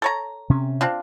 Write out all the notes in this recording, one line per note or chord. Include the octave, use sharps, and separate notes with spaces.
A4 C#5 A#5
C3 C#4
C4 D4 F4